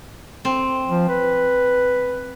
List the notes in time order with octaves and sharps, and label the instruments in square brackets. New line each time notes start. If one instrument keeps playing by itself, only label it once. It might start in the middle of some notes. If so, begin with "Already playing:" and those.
[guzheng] C4
[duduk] F3
B4